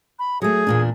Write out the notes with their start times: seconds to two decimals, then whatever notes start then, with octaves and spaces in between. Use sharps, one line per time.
0.19 B5
0.42 F#3 A3 G#4
0.67 E2 A#2 D4